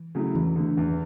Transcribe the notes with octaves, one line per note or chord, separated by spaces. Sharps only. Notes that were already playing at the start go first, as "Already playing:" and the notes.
Already playing: E3
C#3 F#3 A3 E4
E2 E3
D3 A3
E2